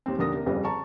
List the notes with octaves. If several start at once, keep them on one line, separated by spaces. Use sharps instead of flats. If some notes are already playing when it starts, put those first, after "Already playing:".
D#2 C4
D#2 D3 A#3 D#6 A#6
C3 A#3
G1 F2 C#3 G3 B4
A5 A#5 C#6